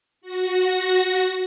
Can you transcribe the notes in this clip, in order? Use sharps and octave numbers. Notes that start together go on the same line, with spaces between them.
F#4 A#6